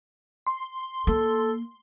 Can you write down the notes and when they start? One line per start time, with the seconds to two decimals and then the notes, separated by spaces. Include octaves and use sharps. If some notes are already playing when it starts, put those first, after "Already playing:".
0.47 C6
1.07 A#3 A4